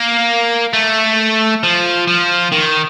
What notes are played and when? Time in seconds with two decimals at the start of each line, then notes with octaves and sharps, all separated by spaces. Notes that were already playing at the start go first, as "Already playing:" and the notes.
Already playing: A#3
0.73 A3
1.63 F3
2.07 F3
2.52 D#3